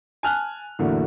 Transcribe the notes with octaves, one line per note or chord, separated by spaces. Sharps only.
G#5 A5 F6 F#6
E2 A2 D3 F#3 A3 A#3